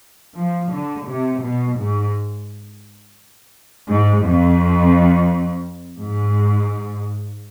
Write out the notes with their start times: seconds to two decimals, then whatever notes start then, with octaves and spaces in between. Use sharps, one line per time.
0.36 F3
0.71 D3
1.07 C3
1.42 B2
1.77 G#2
3.89 G#2
4.23 F2
6.00 G#2